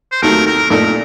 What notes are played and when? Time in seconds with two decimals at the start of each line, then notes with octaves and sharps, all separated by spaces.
0.12 C5
0.22 D#2 D#3 F#3 A3 A#4
0.47 A#4
0.70 A#2 A3 D#4 A4 A#4